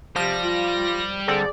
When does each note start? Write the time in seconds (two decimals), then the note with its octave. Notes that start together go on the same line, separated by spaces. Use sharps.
0.16 C3 F3 G3 A#6
0.44 F4
1.28 D3 C4 G#4 A4 D5